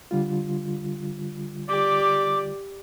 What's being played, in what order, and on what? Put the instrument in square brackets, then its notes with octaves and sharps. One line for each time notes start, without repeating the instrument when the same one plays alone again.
[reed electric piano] D3 G3 F4
[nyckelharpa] G4 D5 [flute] D6